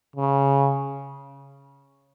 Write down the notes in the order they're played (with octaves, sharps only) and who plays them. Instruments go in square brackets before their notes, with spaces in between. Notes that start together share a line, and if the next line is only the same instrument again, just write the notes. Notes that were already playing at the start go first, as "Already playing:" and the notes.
[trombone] C#3